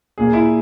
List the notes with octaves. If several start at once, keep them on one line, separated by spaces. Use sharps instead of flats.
A#2 A#3 G#4
E4